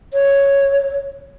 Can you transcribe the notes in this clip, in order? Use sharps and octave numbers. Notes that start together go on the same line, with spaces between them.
C#5